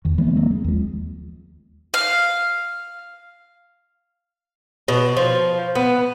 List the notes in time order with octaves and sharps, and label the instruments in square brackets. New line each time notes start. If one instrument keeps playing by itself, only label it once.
[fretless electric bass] E2 D#3
E3 G#3 A#3 B3
D#3 F#3 A#3 C4
G#3
D#2 F3
[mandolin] F5
[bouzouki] B2
F3
B3